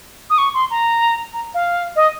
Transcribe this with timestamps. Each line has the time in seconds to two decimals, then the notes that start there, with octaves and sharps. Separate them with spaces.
0.30 D#6
0.38 C#6
0.54 C6
0.71 A#5
1.34 A#5
1.54 F5
1.96 D#5